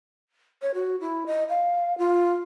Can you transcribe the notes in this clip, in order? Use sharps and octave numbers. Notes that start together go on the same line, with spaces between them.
C#5
F#4
E4
D#5
F5
F4